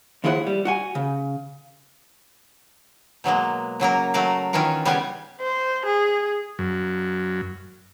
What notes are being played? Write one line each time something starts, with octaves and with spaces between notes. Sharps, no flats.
D#2 F3 E4 G#4 A#4 F#5
G3
F#4 F#5 G#5
C#3
B2 F#3 G#3 A#3
C#3 F#3 A#3 A#4
F#3 A3 A#4 F5
D#3 E3 C#4 F4 A#4
C#3 G3 B3 F4 G#5
C5
G#4
F#2